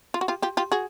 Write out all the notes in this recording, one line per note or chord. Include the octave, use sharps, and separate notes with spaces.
F4
F#4
F4 G4
F4 G4
F4 G4
F#4 G#4